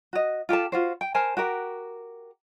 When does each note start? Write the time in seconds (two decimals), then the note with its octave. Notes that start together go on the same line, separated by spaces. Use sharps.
0.13 F#4 D#5
0.49 F4 G4 A4 A5
0.72 F4 F#4 C5
1.01 G5
1.14 A#4 C5 G#5 A5
1.37 F#4 G4 A#4 F#5